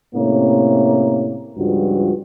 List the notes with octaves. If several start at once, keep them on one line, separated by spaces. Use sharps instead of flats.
A2 C3 A#3 C#4
C#2 G2 F3 F#4